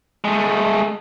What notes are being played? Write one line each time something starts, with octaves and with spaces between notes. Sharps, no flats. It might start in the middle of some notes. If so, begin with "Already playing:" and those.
G#3 A3